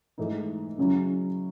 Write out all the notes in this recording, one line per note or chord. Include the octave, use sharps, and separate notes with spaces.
G#2 E3 A3 D#4
C#3 F#3 C#4 E4